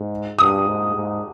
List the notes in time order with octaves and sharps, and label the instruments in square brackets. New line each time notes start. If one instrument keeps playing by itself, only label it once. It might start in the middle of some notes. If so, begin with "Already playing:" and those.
Already playing: [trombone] G#2
[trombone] G2 [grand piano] D#6
[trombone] G#2
G#2